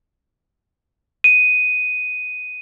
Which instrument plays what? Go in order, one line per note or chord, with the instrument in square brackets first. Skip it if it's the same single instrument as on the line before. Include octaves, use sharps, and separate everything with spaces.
[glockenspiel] D#7